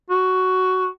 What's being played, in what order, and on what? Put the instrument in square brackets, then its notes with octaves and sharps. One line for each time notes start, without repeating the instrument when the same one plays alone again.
[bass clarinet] F#4